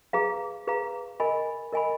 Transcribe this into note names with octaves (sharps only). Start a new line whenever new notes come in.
G#4 B4 F5 A#5
G#4 B4 F5 A#5
A#4 D#5 G#5 B5
A#4 D#5 G#5 B5